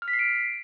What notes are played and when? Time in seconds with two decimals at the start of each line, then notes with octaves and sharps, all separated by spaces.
0.02 F6
0.08 B6
0.13 C7
0.19 D7